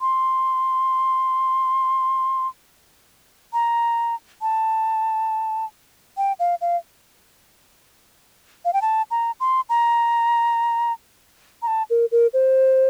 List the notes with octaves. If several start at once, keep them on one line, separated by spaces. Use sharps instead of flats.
C6
A#5
A5
G5
F5
F5
F5
G5
A5
A#5
C6
A#5
A#5
A5
A#4
A#4
C5